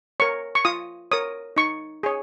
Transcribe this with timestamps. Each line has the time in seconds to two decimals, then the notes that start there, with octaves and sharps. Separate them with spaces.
0.20 A#4 C#5 C#6
0.55 C#6
0.65 F4 D#6
1.11 A#4 C#5 D#6
1.56 D#4 C#6
2.03 G#4 C#5